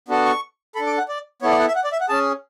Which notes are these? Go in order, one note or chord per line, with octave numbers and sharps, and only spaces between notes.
B3 D4 F#4 A4
C#6
D4 A4 B5
D6
F#5
D5
B3 E4 A4 C#5
D5
F#5
E5
F#5
D5
E5
F#5
C#4 G#4 A5